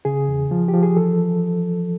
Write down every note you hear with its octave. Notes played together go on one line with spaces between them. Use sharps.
C#3 G#4
E2
F3
G4
F3
G#4
E3 A4
E3